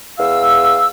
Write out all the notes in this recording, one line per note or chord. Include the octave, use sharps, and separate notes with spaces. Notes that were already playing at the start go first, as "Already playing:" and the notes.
E2 F5 E6